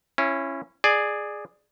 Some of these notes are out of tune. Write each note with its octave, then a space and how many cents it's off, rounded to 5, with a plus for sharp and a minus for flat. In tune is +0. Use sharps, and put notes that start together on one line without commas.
C#4 -15 E4 +25
G#4 +0 D5 +20